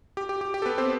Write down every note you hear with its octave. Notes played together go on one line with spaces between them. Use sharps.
G4
G4
G4
G4
A4
B3 B4
C4 C5